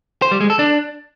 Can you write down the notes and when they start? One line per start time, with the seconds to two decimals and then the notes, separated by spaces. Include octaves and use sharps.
0.22 C5
0.31 G3
0.41 G#3
0.50 A4
0.59 D4